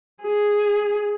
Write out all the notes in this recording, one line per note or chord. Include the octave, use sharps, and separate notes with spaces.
G#4